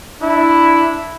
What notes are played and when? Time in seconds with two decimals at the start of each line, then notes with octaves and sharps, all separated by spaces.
0.21 D4 E4